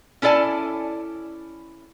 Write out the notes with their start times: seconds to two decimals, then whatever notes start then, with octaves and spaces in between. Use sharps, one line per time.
0.22 C#4 E4 A4 D5 G#5 A5